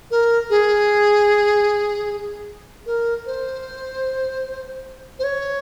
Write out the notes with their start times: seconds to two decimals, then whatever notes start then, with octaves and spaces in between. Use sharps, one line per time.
0.11 A#4
0.50 G#4
2.86 A#4
3.26 C5
5.19 C5
5.24 C#5